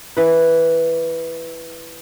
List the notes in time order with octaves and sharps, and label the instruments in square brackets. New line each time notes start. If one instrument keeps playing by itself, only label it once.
[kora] E3 B4